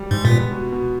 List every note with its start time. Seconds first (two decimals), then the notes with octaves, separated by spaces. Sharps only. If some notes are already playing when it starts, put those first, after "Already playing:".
Already playing: G3
0.11 G#2 G#3
0.25 A#2
0.31 B3
0.51 B2
0.72 B2